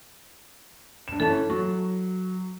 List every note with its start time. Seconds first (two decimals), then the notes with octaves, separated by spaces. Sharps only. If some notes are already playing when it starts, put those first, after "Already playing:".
1.08 G2 E7
1.20 E3 C#4 A4 A5
1.50 F#3 C#6